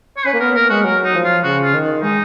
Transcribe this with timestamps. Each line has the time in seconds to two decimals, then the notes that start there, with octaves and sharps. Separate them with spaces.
0.17 C#5
0.26 C#4 B4
0.33 A#3
0.40 B3 A#4
0.56 A#3 A#4
0.70 G#3 F#4
0.85 F#3 A#4
1.04 D#4
1.14 F3
1.24 F4
1.44 C#3 F#4
1.63 F4
1.74 D#3
2.03 G#3 D#4